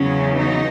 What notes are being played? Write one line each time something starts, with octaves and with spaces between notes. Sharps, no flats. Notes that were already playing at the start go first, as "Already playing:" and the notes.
Already playing: E2 C#3 F#3 C#4
D#4